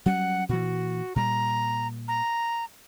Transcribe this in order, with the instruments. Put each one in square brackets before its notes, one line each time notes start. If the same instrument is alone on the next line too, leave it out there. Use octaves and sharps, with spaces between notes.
[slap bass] F#3 G3 C#4 [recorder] F#5
[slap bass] A#2 E3 [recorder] F#4
[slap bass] A#2 G3 [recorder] A#5
[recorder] A#5